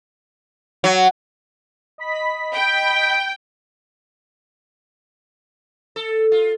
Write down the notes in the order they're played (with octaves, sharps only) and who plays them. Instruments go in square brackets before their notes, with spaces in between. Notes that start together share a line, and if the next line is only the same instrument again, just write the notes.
[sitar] F#3
[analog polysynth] D#5 B5 B6
[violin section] G5
[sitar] A4
F4